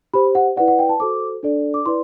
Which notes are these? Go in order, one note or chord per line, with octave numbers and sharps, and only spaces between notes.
G4 C5 B5
F#5
E4 B4 D5 F#5
F#5
G5
A5
F#4 A4 C5 D6
D4 A4 D5
D6
E4 B4 D5 C6